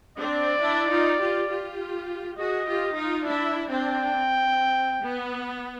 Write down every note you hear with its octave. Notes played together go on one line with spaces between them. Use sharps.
C4 D4 D5
D4 E4
D#4 F4
F4 G4
F4 G4
F#4 G#4 D#5
F4 G4
D#4 F4
D4 E4 E5
C4 D4 G5
C4
B3